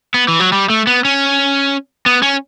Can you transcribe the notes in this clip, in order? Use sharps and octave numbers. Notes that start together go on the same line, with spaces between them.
B3
E3
F#3
G3
A3
B3
C#4
B3
C#4